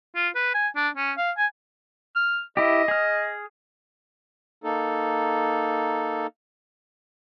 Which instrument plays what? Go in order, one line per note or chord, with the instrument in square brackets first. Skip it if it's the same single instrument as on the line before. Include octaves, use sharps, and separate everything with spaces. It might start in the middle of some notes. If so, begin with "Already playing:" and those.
[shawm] F4
B4
G#5
D4
C#4
F5
G#5
[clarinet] F6
[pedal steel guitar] E4 G4 [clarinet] D#5
[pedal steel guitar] G#4 F6
[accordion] A#3 D#4 A4